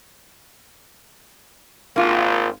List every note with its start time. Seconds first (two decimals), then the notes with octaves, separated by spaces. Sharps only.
1.96 G#1 A#3 F4